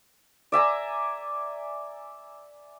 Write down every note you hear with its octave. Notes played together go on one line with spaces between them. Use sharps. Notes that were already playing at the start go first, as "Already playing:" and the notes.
D5 E5 G#5 A#5